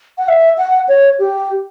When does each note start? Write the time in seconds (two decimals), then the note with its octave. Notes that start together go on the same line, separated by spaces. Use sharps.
0.18 F#5
0.28 E5
0.58 F#5
0.89 C#5
1.19 G4